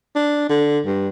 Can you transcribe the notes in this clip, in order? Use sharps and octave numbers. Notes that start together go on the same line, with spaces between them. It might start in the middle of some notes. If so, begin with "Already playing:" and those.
D4
D3
G2